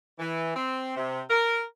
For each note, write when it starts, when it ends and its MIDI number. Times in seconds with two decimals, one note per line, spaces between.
0.19 0.53 52
0.56 0.95 60
0.96 1.21 48
1.30 1.62 70